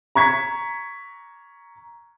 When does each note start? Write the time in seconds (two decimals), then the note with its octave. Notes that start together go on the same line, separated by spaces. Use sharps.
0.15 A#5 C#6 G#6 B6